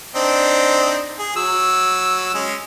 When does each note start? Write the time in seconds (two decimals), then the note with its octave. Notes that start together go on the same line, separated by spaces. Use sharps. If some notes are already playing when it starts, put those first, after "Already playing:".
0.15 C4 D4 D#4
1.19 G#4
1.36 F#3 E6
2.34 G#3 C#4 G#4